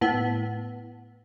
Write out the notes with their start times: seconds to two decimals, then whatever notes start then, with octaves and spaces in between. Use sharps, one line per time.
0.01 A2 B3